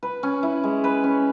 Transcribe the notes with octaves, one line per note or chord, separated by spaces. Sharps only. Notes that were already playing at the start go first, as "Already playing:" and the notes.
B4
C#4
E4
G#3
B4
C#4